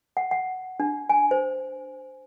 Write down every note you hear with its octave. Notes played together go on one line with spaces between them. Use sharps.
F#5
F#5
D4
G#5
C5